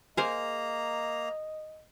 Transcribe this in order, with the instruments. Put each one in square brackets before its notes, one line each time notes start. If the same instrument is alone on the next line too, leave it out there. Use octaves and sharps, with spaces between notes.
[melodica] A#3 A#5 [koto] G#4 A#4 C5 [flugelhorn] D#5